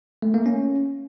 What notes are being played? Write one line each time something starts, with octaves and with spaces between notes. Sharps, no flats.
A3
A#3
C#4